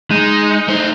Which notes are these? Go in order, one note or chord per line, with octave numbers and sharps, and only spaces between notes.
G#3 D#4
A3 C5